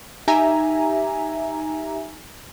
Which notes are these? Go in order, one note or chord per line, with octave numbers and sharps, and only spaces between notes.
D#4 G4 E5 G#5 A#5